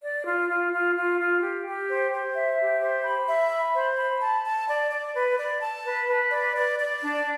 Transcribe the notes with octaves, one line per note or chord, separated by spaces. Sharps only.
D5
F4
F4
F4
F4
F4
G4
G4
C5
C5
E5
G4
C5
B5
E5
B5
C5
B5
A5
A5
D5
D5
B4
D5
A5
B4
B4
D5
D5
D5
D4